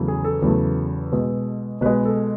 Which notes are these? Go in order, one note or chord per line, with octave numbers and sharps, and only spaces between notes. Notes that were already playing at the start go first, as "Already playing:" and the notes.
Already playing: E2 C#3 F#3 A3
G#4
A4
E2 C#3 F#3 A3
B2 G#3
B2 G#3 B4
A4